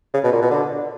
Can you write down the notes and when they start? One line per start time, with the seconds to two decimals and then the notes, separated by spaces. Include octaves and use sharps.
0.14 C#3
0.24 B2
0.32 A#2
0.42 B2
0.50 D3